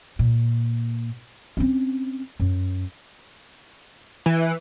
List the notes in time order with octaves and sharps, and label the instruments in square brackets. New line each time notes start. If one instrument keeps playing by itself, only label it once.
[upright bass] A#2
C4 C#4
F#2
[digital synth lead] E3